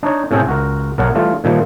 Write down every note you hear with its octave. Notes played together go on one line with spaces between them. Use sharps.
D4 D#4 C#5
A2 C3 C#4 G#4 A4 G5
C#2 F#4 A#4
B1 A#4 C#5 F#5
E3 G3 A3 F4
A#2 D#3 F3 G3